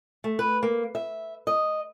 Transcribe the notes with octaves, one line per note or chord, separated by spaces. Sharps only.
A3
B4
A#3
E5
D#5